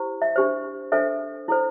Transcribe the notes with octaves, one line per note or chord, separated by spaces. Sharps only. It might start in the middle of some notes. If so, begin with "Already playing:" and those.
Already playing: E4 G4 C5
E5
D4 G4 C5
D4 A4 C5 E5
E4 A4 C5